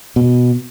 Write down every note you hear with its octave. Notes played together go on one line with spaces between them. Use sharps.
B2